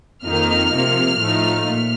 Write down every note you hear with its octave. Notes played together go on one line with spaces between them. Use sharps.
F2 D#3 A#3 D#4 F6
C3 F3 A#3
A2 F3 A3 D#4
A#2